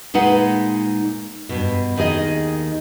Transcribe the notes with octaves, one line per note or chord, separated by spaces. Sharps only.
A#2 G#3 D#4 B4 F#5
G2 B2
D#2 D#3 D#4 G#4 D#5